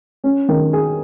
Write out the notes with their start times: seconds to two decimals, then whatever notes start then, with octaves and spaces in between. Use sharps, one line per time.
0.24 C#4
0.49 D#3
0.73 G#4